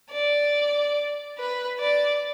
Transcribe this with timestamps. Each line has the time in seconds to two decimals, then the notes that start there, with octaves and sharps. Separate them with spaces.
0.11 D5
1.38 B4
1.80 D5